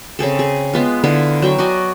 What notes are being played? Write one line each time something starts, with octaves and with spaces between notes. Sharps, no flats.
C#3 C4 G#4 A4
G#4
G#3 B3 F4
D3 B3 E4 F4
F#3 G5 C#6
F#4 D5 D#5 G#5